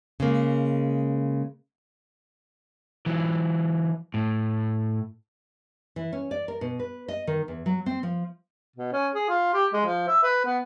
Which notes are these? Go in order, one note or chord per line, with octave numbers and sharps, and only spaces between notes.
C#3 G#3 A#3
E3 F#3
A2
E3
C#4
D5
A#4
B2
B4
D#5
D#3
E2
F#3
C4
F3
B2
C#4
G#4
F4
G4
G#3
F3
E5
B4
B3